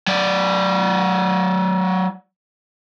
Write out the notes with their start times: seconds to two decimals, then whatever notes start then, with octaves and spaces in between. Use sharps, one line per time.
0.07 F#3 D5